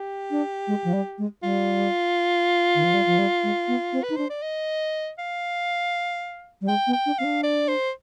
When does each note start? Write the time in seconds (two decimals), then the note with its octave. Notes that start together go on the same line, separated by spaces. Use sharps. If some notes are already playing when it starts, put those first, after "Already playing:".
Already playing: G4
0.31 D4
0.67 G#3
0.84 F3
0.93 G3
1.18 G#3
1.43 G3 F4
2.75 D#3
2.84 F3
2.94 G3
3.06 F3
3.19 G3
3.43 G#3
3.68 B3
3.93 C4
4.03 B4
4.10 D#4
4.17 D4 C5
4.30 D5
4.43 D#5
5.19 F5
6.61 G3
6.68 G#3 G5
6.87 B3
6.93 G5
7.06 D4
7.18 C4 F5
7.24 D4
7.43 D5
7.68 C5